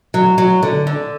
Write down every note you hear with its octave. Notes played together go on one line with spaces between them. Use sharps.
F#3
F#3
D3
D3